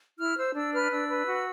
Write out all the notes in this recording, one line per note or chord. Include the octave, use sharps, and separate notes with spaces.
E4 F6
C5 E6
D4 E6
B4 F6
D4 E6
B4
F#4